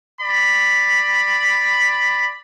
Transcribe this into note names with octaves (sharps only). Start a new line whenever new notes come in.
D5 B5